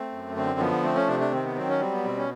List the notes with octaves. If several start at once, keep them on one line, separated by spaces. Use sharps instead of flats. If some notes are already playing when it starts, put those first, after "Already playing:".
Already playing: A3 C4
F#2
D3 C4
F3 B3
A3 C4
C#4
C3 D4
D4
D#3 C4
B3
F#3 C4
C#4
G3 C4
B3
B2 C4
C#4